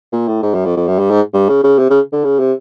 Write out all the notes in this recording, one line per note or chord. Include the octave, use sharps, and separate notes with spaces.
A#2
A2
G#2
F#2
F2
F2
F#2
G2
G#2
G2
C#3
C#3
C3
C#3
D3
C#3
C3